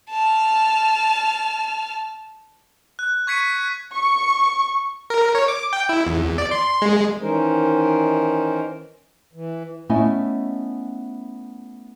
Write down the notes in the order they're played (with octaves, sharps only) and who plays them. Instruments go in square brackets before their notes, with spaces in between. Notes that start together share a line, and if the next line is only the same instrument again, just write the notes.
[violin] A5 F6
[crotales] F#6
C#6 G#6 B6 C#7 D#7
[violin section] C#6
[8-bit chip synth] A#4
C#5
D6
G5
E4
E2
D5
C6
G#3
[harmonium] D#3 E3 C#4 D#4 A#4 C5
E3
[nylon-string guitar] A3 B3 C#4 E4 D#5 G#5